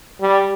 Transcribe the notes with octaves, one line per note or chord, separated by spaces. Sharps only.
G3